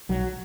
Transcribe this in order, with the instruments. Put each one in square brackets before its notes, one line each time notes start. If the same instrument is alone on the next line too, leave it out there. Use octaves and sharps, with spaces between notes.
[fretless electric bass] B1 F#3